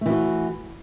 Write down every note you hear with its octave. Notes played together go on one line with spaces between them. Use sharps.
E3 A3 F#4